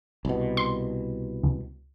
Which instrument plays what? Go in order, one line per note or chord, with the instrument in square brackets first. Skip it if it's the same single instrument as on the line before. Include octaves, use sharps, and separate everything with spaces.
[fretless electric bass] C2 B2
[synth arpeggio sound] C6
C#2